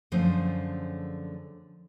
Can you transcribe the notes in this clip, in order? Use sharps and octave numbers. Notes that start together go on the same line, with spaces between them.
F#2 D3 F3 A3 G#4 C5